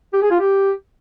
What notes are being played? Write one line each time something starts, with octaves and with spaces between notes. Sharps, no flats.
G4
G#4
F4
G4